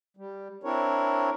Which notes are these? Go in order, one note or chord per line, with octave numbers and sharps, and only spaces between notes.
G3
C4 D4 E4 A#4 C#5